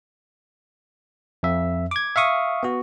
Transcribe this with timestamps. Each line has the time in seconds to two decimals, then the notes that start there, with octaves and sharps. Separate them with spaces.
1.43 F2 E5
1.91 D6 G#6
2.16 E5 F5 C#6 D#6
2.63 B3 F#4